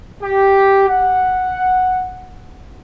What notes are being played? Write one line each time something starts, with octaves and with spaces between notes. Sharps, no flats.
G4
F#5